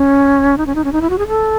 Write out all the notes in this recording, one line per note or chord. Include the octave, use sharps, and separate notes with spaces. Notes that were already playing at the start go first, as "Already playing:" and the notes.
Already playing: C#4
D#4
C#4
D#4
C#4
D#4
E4
F#4
G#4
A4